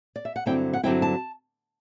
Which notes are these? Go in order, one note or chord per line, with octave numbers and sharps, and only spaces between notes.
D5
E5
F#5
G2 D3 F#3 C4 E4 G5
F#5
G2 D3 F#3 C4 E4 G5
A5